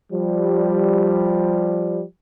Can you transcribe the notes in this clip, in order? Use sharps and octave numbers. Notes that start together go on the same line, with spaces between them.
F3 G3